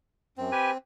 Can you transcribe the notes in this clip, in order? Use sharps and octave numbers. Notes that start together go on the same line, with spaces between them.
F#2 C4
G4 B4 G#5